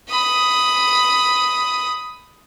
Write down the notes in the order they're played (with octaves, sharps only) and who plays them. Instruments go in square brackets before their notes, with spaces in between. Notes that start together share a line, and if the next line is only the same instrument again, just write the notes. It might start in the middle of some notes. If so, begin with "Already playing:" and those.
[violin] B5 D#6